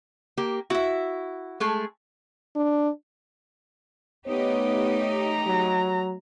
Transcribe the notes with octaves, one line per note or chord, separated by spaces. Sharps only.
A#3 G4
E4 F#4 E5
G#3 A3 G#4
D4
A3 B3 D#4 G4 C#5
A#5
F#3